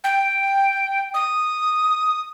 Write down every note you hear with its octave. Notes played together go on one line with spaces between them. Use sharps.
G5
D#6